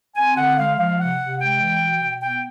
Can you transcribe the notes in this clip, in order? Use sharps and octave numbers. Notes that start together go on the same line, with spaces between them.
C4 G#5
D3 F#5
G#3 F5
F3 F5
C3 F#5
C3
G#3 G5
E3
B2
B2
B3 G5